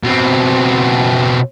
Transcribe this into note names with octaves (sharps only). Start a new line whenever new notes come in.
B2 C4